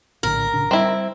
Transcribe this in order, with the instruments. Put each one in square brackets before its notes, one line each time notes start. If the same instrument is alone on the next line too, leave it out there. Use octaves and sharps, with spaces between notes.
[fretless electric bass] A#1 A2 D3 [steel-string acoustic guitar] A#4
[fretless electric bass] A1 C#3 D4
[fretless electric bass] G3 [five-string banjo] C4 E4